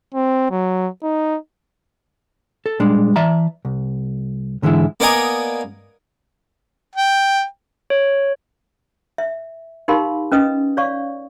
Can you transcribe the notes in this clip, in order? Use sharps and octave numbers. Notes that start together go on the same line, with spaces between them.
C4
F#3
D#4
A4
A#2 G3 G#3 D4
E3 D5 E5 A5 A#5
C2
G#2 D3 E3 G#3 E4
A#3 B3 D5 D#5 G#5 A#5
G5
C#5
E5
D#4 G4 A#4 F5 B5 C6
C#4 B4 D#5 D#6
C#5 D5 F5 C#6